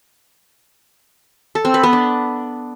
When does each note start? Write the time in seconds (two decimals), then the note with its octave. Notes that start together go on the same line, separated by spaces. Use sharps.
1.55 A4
1.65 C4
1.74 B4
1.83 B3
1.93 D4